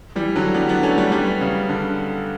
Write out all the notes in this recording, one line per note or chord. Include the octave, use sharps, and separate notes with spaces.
E3 G3
D3 F#3
G3 B3
B3 D4
A3 C#4
G3 B3
G3 B3
C#3
D3